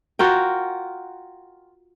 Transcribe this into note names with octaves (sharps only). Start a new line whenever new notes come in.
F4 F#4 A#4 G5